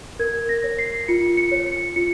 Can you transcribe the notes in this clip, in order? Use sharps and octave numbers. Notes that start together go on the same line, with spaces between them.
A#4 G#6
A#6
C#5
C7
F4 C#7
C#7
C#5
C#7
F4 C#7